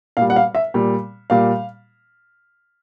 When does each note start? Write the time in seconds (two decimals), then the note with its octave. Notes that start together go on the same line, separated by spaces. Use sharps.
0.17 A#2 G3 F5
0.30 F#5
0.36 F5
0.55 E5
0.74 A#2 G3
1.30 A#2 G3 F5